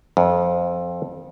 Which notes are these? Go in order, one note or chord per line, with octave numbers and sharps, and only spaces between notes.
F2